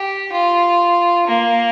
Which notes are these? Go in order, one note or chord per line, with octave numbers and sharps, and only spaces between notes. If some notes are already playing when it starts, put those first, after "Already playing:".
Already playing: G4
F4
A#3